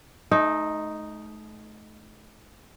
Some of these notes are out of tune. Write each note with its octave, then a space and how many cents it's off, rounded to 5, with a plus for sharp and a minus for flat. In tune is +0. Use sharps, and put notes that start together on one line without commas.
A3 -35 D#4 +0